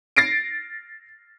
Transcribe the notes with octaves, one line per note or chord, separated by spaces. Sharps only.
A6 A#6 C7 D7